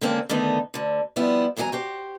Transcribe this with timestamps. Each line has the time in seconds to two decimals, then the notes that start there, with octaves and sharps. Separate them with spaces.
0.01 D3 D#3 G#3 A#3 C4 C#4
0.29 D3 D#3 A3 B3 D#4
0.74 D2 D3
1.16 F3 G3 B3 E4
1.56 E2 G#2 F#3 G4 G#5 A#5
1.72 F#4 G4 C5